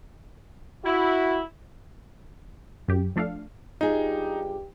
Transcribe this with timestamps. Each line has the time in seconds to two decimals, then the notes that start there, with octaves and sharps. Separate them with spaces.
0.85 E4 F#4
2.88 F#2 G4
3.16 F3 A3 D4 A4 F5
3.81 G2 D#4 F4 G4 G#4